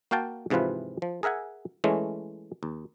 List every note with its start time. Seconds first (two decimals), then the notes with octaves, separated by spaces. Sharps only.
0.11 A#3 F#4 F5 G5 A5
0.50 G#2 C3 E3 F3 F4 B4
1.02 F3
1.23 G#4 A#4 E5 F#5 G#5
1.84 E3 G#3 A3 C#4
2.63 D#2